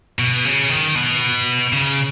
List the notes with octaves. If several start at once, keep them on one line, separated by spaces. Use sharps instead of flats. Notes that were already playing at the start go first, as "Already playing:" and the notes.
B2
C#3
D#3
B2
C#3